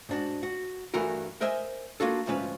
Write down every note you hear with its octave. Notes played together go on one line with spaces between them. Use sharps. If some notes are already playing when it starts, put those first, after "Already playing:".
G#2 D4 F#4
F#4
G2 E3 A3 F#4 A#4
A#4 C5 D#5 E5 G#5
A#3 D4 F4 F#4 A4
D2 G#2 F3 C#4 B4